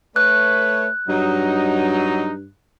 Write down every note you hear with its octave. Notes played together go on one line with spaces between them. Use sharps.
A3 B4 C#5 F#6
G2 F#3 D#4